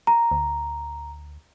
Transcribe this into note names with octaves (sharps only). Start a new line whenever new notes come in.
A#5
D2